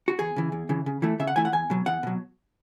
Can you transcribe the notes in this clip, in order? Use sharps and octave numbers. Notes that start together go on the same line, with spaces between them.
F#4
E2 G#4
C#3 E3
E2
C#3 E3
C#3
E3 A3 E4
C#3 E5
F#5
E3 A3 E4 G#5
F#5
E2 G#5
B2 F#3
E2 F#5
B2 F#3